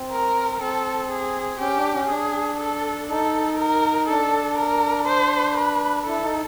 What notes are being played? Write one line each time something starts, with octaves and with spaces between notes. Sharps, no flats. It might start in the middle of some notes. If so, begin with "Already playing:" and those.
Already playing: C4
A#4
C4 A4
G#4
C#4 G4
D4
C#4
D4 G#4
A4
D#4 A4
A#4
D4 A4
A#4
C5
B4
E4 A4
D#4